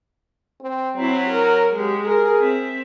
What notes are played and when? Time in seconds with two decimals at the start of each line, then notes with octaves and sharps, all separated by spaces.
0.61 C4
0.96 F#3 C4 E4
1.29 A#4
1.73 G#3 G4
2.06 G#4 A#4
2.38 C4 E5